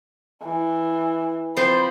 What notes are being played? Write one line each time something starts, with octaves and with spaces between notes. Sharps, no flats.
E3
F3 C4 C5 B5